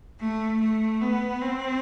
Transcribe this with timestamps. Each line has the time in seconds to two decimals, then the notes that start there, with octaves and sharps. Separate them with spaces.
0.20 A3
0.61 A3
1.01 B3
1.42 C4